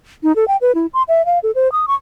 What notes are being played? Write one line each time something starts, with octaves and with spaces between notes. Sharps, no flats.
D#4
A4
G5
B4
E4
C6
E5
F5
A4
C5
D#6
C#6